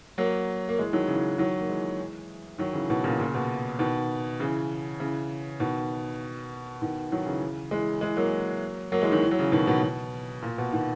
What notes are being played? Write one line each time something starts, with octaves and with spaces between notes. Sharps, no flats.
F#3 A#3
A#3
E3 G#3
D#3 F#3
C#3 E3
D#3 F#3
A#3
E3 G#3
D#3 F#3
C#3 E3
B2 D#3
A#2 C#3
A#2 C#3
B2
B2 D#3
C#3 E3
C#3 E3
B2 D#3
B2 D#3
D#3 F#3
C#3 E3
E3 G#3
E3 G#3
F#3 A#3
F#3 A#3
E3 G#3
D#3 F#3
E3
F#3
C#3 E3
B2 D#3
B2 D#3
B2
A#2
B2
B2 D#3